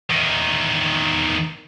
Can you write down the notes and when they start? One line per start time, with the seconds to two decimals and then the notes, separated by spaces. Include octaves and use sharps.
0.10 E2 D#3